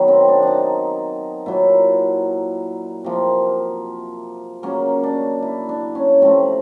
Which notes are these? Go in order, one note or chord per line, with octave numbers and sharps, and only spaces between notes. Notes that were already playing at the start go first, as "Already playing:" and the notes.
Already playing: D#3 F#3 B3
C4
D4
D4 D#4
A#2 F#3 A#3 E4
C3 F3 A#3
C#3 F#3 A#3 C#4
D4
E4
D4
C#4
C3 F3 A3 C4